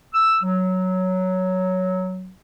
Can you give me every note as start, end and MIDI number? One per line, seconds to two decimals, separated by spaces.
0.14 0.39 88
0.43 2.31 54